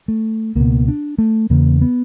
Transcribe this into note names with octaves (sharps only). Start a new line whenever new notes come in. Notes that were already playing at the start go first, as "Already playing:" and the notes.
A3
C#2 B2 A#3
D4
A3
E2 C#3 A#3
B3